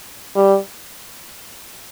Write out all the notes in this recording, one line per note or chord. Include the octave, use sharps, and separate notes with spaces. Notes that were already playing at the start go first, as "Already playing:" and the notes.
G3